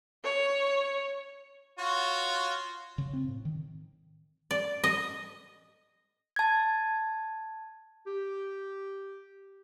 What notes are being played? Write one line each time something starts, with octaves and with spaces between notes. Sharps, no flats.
C#5
F4 F#4 C#5
C#3
C4
A2
D#3
D5
D#5
A5 G#6
G4